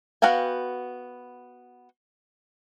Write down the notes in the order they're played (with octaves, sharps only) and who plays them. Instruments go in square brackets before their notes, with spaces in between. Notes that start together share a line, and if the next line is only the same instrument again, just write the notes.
[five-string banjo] B3 F#4 F5 G5 G#5